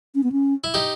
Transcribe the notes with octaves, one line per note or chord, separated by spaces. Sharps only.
C#4
B3
C#4
E4
D#4 G4